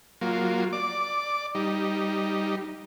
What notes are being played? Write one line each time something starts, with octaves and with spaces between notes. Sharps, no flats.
F#3 A#3 F4
D5 D6
G3 D#4